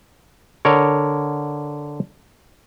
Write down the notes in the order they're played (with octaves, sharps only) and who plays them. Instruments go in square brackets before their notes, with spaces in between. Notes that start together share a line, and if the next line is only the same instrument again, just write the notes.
[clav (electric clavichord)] D3 A#4 C#5